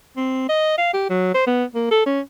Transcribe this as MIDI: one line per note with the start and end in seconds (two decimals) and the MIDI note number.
0.17 0.46 60
0.49 0.77 75
0.78 0.93 77
0.94 1.05 67
1.10 1.32 54
1.34 1.45 72
1.47 1.64 59
1.75 1.89 58
1.91 2.02 69
2.06 2.20 61